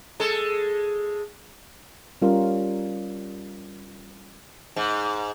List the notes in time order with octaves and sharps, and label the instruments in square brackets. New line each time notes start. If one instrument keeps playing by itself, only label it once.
[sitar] G#3 A4
[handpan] G3 C#4 F4 A#4
[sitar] G#2